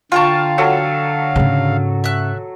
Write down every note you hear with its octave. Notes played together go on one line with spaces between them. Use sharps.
D3 F4 F5 G5 A5 A#5 C#6
F#3 A4
G#2 C#3
E5 F#6